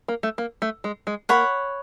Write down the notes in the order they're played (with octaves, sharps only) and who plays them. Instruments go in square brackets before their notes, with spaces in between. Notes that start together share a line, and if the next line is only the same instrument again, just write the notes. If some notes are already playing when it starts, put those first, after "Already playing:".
[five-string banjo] A#3
A3
A#3
A3
G#3
G#3
[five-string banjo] A#3 [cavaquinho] C#5 F#5 B5